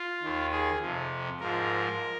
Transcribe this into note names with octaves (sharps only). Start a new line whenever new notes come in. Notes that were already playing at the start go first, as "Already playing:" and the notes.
Already playing: F4
D#2 D#3
G#4
F2 C3 F3
G#2 F3 A#4